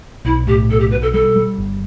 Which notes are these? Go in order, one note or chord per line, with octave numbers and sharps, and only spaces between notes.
B1 E4
A2 G4
B1 A4
G4
B2 B4
A4
G3 A4
G3
G1